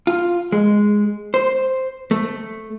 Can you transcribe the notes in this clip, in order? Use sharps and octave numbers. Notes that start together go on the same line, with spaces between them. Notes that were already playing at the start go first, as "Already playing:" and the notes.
F4
G#3
C5
A3